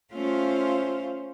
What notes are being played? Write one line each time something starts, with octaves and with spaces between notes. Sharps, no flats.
A3 C#4 F4 C5 F5